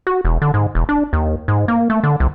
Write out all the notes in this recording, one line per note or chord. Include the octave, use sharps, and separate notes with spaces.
F#4
E1
D3
G#2
E1
D4
D#2
G#2
A#3
A3
D3
C2